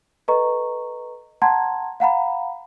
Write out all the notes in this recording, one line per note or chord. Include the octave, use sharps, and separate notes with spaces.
A4 B4 D#5 A#5 C#6
F#5 A5 A#5 C6 G#6
F5 F#5 A#5 B5